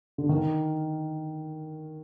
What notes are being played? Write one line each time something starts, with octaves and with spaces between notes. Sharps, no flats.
D3
D#3